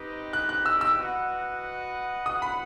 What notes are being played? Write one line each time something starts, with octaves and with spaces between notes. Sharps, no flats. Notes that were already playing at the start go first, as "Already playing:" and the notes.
Already playing: C4 D#4 G4 B4 D#5
F#6
F#6
E6
E6
F#4 B4 D#5 F#5
F#4 B4 F#5 D#6
B5